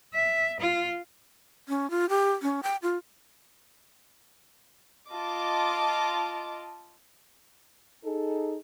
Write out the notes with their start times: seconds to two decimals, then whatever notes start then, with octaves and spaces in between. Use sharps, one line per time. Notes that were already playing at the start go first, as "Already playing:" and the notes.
0.14 E5
0.60 F4
1.69 C#4
1.90 F4
2.09 G4
2.42 C#4
2.63 G5
2.83 F4
5.12 F4 D#5 A5 D6
8.04 D#4 G#4 A4